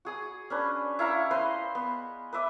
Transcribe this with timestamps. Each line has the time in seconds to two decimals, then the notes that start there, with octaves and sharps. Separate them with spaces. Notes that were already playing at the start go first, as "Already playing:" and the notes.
0.05 F#4 G#4 D#6
0.50 C#4 D4 B4
0.99 E4 F5 A#5 C#6
1.31 B4 C5 D#5 C6
1.75 B3
2.33 B4 D#5 E5 D6